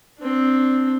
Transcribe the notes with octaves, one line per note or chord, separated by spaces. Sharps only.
C4 D4